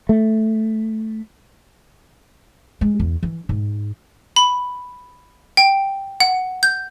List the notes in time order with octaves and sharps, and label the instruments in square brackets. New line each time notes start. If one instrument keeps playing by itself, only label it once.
[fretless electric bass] A3
[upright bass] G#3
E2
E3
G#2
[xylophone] B5
G5
F#5
G6